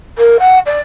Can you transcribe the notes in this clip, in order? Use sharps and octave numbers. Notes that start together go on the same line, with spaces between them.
A#4
F#5
D5